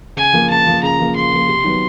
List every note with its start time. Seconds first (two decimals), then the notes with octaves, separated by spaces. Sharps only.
0.16 C#3 G#5
0.33 F3 A#3
0.50 C#3 A5
0.67 F3 A#3
0.83 C#3 A#5
0.99 F3 A#3
1.15 C#3 C6
1.32 F3 A#3
1.48 C3
1.64 D#3 F#3 B3